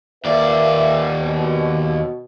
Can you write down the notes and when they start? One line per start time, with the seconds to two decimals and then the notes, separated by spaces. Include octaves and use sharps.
0.25 D#2 A#3 B4 D5 E5
1.20 B2